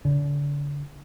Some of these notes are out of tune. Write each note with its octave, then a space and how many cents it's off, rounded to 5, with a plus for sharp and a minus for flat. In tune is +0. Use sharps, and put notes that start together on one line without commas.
D3 -35